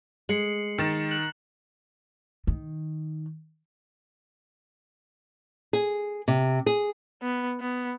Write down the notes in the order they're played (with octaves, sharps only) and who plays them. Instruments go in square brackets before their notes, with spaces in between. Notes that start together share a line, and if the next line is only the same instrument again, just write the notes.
[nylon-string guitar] G#3 [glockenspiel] C7 C#7 F#7
[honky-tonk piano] D#3 A6 E7
[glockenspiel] F#6 F#7
[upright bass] D#3
[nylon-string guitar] G#4
C3
G#4
[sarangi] B3
B3